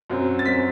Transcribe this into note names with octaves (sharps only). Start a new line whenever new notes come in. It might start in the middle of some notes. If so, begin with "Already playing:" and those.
F#2 F#3 C4
A6
F#3 C4 B6